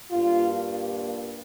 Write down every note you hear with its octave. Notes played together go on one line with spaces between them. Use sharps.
G2 G3 A#3 F4
F4